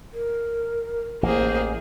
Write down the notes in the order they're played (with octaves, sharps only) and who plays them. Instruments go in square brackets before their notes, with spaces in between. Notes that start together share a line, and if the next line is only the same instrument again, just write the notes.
[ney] A#4
[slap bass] A1 [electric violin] A#3 G#4 [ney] C5